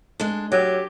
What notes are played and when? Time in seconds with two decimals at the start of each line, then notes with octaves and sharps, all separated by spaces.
0.20 G#3 D4
0.52 F#3 G4